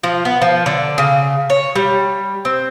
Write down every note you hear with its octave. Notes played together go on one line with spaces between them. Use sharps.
F3
B3
F3
D3
C#3
C#5
G3
C4